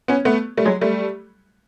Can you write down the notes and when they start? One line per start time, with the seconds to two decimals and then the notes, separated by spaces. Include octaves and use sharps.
0.08 B3 C#4
0.25 A3 B3
0.57 G3 A3
0.65 F#3 G#3
0.81 G3 A3